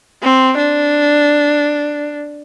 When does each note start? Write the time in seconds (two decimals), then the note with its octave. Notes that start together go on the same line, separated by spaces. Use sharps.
0.23 C4
0.58 D4